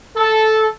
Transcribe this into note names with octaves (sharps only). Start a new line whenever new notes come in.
A4